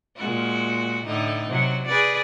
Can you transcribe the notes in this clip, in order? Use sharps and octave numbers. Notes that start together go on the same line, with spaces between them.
A#2 G#3 F#4
A2 D3 D#4
C3 F#3
G#4 B4 D5